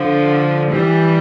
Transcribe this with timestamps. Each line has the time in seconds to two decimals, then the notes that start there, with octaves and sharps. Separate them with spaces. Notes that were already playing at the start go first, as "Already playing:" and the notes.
Already playing: D3 F3
0.70 E3 G3